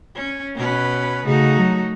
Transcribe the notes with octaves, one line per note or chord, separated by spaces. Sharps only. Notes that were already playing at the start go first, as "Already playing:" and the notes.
C#4
B2 C#4 B4
C#3 A3 D#4 F#4
F#3